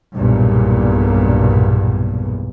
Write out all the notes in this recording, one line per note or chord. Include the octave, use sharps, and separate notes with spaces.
B1 E2 G2 A#2